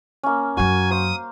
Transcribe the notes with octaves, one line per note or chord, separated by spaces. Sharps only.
A#3 C#4
F#2 F#3 F#4 G#5
C5 F5 D#6